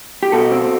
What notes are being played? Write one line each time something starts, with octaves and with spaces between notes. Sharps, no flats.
G4
B2 F#4 A4
C4